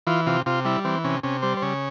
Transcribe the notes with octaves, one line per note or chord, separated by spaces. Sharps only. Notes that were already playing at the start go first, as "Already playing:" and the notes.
E3 F4
C3 F4
C3 F4
G3 E4
E3 C4
C3 C#4
C3 C#4
G3 C5
C5
C#3 C#5